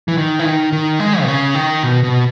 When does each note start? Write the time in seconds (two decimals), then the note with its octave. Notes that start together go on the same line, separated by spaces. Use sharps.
0.08 E3
0.17 D#3
0.39 E3
0.45 D#3
0.72 D#3
1.00 G#3
1.22 B2
1.28 C#3
1.55 D#3
1.83 B2
2.04 B2